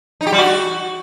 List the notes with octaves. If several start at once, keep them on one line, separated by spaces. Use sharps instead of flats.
D#4
G4
G3
F#4